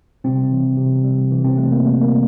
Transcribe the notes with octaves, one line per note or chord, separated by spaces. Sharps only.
C3 G3 C4
E3
C3
G3
E3
C3 C4
E3 A3
A#3
C3 A3
A#3
G3